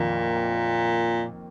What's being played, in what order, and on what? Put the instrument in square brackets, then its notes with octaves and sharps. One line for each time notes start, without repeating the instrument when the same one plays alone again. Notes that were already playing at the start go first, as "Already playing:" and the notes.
Already playing: [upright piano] F2 D#3 A#3 [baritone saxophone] A#2